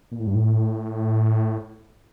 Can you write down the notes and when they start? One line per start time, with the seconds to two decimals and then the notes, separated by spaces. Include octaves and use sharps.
0.12 A#2
0.20 A2
0.27 G2
0.35 A2